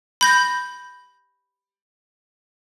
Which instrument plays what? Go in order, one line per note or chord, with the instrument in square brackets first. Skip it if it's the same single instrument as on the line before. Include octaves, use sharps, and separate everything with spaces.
[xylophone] B5 G6 A#6